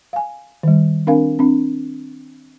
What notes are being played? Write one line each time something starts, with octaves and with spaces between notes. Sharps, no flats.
F5 G#5
D#3 G3
C4 D4 A#4 F5 G#5
C4 D4